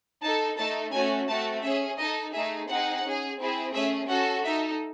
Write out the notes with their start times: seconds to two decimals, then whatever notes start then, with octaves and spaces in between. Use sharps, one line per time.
0.22 D#4 A4 A5
0.57 A3 D#4 A4 A5
0.92 A3 C#4 F#4 G#5
1.27 A3 C4 F#4 A5
1.62 C#4 G#4 E5
1.98 D#4 A4 D#5
2.33 A3 D#4 G#4 E5
2.68 C4 D#4 G#4 F#5
3.03 C#4 G#4
3.38 C4 E4 G#4
3.73 A3 C#4 G#4 E5
4.08 C#4 F#4 A4 F#5
4.44 D#4 A4 E5